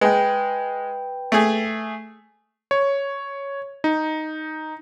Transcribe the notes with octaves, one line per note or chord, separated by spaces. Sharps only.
G#3 B4 G5
A3 G#4
C#5
D#4